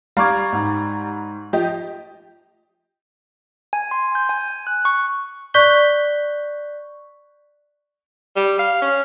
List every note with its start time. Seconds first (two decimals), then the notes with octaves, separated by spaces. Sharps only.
0.17 G3 F5 A#5 C#6 D6 G#6
0.52 G#2
1.53 F3 G4 D#5
3.73 G#5
3.91 C6
4.15 G6
4.29 G#5
4.67 F#6
4.85 C#6
5.54 D5 C#6 F#6 G6 B6 G7
8.36 G3
8.59 F5
8.82 C#4